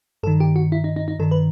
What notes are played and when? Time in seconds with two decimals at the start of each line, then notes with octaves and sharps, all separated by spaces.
0.23 G2 A4
0.27 D#3
0.40 G4
0.56 F#4
0.72 E4
0.84 D#4
0.96 D#4
1.08 D#4
1.19 G2 D#3 A4
1.31 B4